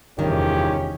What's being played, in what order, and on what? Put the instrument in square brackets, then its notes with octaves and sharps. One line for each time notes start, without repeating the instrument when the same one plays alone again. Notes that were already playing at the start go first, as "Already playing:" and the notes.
[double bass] F1 E2 [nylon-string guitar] G2 D#3 [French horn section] C#4 F4 G4